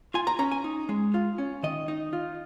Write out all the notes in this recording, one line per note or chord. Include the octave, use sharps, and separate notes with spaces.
F4 G#5
A#5
C#4 A#5
G#5
D#4
G#3
F4
C#4
D#3 D#5
D#4
F4